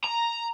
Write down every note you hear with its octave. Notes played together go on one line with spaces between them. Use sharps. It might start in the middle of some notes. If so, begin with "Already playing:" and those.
A#5